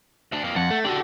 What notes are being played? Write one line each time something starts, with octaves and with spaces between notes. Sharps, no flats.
D2 D4
F2 A#3
F2 F#5
A3
D4 F#4 G4 A4